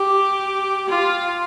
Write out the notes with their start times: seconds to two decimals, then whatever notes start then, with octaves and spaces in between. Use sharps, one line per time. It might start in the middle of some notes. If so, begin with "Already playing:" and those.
Already playing: G4
0.89 F4